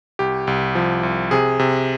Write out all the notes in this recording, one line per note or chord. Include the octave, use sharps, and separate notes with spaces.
C2 G4
C2
F3
C2
C3 G#4
C3